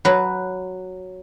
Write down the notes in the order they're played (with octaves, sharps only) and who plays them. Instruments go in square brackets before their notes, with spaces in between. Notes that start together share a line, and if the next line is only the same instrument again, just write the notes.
[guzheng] F#3 B4